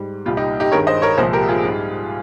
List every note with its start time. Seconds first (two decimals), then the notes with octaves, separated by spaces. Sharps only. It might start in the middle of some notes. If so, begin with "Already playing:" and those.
Already playing: G#2 G3
0.26 C2 A#2 G3 F4
0.37 D#4 G4
0.60 D#4 G4
0.72 G2 D#3 G#3 A#4 C#5
0.87 C5 D#5
1.02 A#4 C#5
1.17 C2 A#2 F3 G#3 G#4 C5
1.33 G4 A#4
1.49 F4 G#4
1.63 G#2 G3